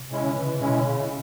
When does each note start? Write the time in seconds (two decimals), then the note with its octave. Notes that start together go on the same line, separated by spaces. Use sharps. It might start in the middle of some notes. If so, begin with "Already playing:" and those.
Already playing: C3
0.11 G#3 C#4 E4
0.24 D3
0.36 C#3 E3
0.60 B2 G#3 C#4 E4
0.85 A#2 C#3